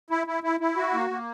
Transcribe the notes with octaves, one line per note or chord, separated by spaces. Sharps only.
E4
E4
E4
E4
F#4
A#3
A#3